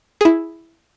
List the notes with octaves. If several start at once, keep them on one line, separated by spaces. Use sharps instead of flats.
E4 G#4